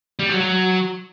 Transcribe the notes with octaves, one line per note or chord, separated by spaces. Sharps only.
G3
F#3
F#3